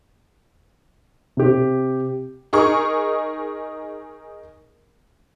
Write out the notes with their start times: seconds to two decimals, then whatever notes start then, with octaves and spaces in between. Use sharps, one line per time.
1.37 C3 G4
2.53 D#4 G#4 A#4 C#6